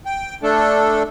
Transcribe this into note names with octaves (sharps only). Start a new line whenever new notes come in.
G5
A3 D4 A4